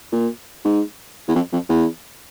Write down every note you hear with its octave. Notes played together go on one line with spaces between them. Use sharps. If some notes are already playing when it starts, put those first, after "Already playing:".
A#2
G#2
E2
F2
F2
E2